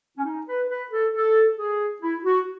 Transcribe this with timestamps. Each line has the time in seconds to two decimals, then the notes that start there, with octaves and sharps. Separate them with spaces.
0.17 C#4
0.25 D#4
0.47 B4
0.69 B4
0.91 A4
1.14 A4
1.58 G#4
2.01 E4
2.24 F#4